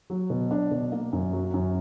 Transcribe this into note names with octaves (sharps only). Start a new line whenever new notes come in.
F#3
B2
D4
B2
A#3
F#2
F#3
F#2